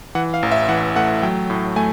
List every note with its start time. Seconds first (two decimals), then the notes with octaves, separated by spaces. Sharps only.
0.15 E3 F#5
0.34 F5
0.43 A1
0.51 E5
0.69 E3 F#5
0.96 A3 F#5
1.22 F#3 G5
1.50 A2
1.76 A3 G#5